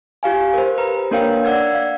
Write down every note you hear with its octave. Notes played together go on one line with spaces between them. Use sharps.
F4 G4 F5 G#5
A#4 C5
B4 A#5
A#3 D4 A#4 C#5 F5 G5
D5 F#5 E6 G#6
F5